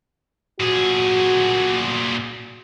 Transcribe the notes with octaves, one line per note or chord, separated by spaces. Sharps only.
A#2 F#4 G#4